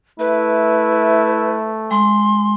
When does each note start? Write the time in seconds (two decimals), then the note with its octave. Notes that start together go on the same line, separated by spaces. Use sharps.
0.19 A3 E4 B4
1.91 G#3 C6